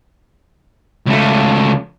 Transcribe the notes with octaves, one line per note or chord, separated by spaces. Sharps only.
C#2 A3